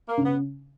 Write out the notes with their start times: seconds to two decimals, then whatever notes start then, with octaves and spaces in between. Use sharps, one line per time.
0.09 A#3
0.18 C#3
0.25 B3